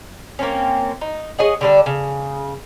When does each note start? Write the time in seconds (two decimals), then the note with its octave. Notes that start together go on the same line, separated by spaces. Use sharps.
0.39 A#3 C4 C#4
1.01 D#4
1.38 G#4 C#5 D#5 F#5
1.61 D3 G3 D4
1.86 C#3